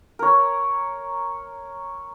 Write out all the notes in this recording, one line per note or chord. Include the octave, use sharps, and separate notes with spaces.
A#4 C#5